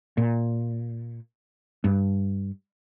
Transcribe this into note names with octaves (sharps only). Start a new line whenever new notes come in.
A#2
G2